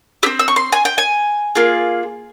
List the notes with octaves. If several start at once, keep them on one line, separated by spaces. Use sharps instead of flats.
C4 G4 E6
E6
C#6
C6
G#5
G5
G#5
A#3 F4 G#4